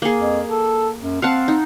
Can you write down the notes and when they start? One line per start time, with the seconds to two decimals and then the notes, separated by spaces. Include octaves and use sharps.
0.02 A#3 G#4
0.18 F2
0.48 A4
1.00 F#2
1.22 C4 F5 F#5 A5
1.48 D#4